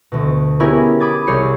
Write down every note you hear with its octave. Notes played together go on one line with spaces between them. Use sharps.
D2 B2
B3 C#4 E4 G4 G#4 A#4
B5 D6 D#6 G#6 A6
C2 G#4 C#5 G6 C7 C#7